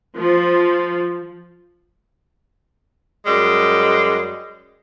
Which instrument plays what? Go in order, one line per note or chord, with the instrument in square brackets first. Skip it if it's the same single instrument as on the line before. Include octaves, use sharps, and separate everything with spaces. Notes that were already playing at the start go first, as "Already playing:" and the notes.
[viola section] F3
[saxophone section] F#2 G3 G#3